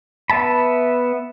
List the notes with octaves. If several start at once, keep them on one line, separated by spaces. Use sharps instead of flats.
B3 E5 A5 B5